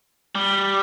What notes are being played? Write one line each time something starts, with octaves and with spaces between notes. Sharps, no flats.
G3